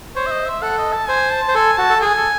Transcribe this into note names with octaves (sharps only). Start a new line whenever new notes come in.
C5 C#5
E5
D#5
E5
A4 F#5
D#5
A5
C5 G#5
A5
C5
A4 G#5
F#4 A5
A4
G#4 G#5
A4